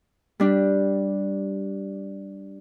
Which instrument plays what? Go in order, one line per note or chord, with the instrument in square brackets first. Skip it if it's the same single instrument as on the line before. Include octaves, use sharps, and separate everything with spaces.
[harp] G3 D4 G4